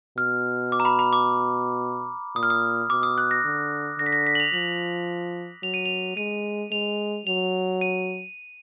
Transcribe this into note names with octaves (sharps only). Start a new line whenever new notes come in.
B2 F6
D6
A#5
B5
B5
D6
A#2 D#6
F6
D#6
B2 D6
D#6
F#6
A#6
D3
D3 A#6
B6
A#6
B6
F#7
F7
F3 F#7
F#3 F7
D#7
F7
G#3 D#7
G#3 F7
F#3 F7
D#7